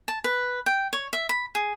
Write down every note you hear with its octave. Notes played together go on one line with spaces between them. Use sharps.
A5
B4
G5
C#5
E5
B5
G#4